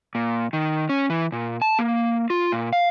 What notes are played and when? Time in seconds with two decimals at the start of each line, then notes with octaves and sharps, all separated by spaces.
0.15 A#2
0.53 D#3
0.89 C#4
1.10 E3
1.32 A#2
1.62 A5
1.79 A#3
2.30 F4
2.52 A#2
2.73 F5